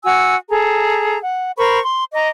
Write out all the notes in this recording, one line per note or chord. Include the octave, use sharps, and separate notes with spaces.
F#4 G#5 E6
G#4 A4 A#5
F#5
A#4 C5 B5 C#6
C6
D#5 A#5 D6